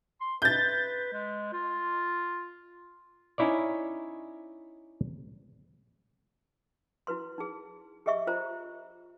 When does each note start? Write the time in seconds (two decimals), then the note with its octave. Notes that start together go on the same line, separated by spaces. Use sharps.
0.21 C6
0.42 B4 G6 A6
1.13 G#3
1.53 F4
3.38 C#4 D#4 E4 C#5 D5
7.07 E4 F#4 B4 C6
7.38 D#4 G#4
8.06 G4 G#4 D#5 E5 C#6
8.27 F4 C5 A#5